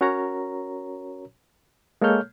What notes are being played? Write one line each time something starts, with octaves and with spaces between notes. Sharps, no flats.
C#4 F#4 A#4 C#5 A#5
G#3 A#3 A4 C#5 F6 G6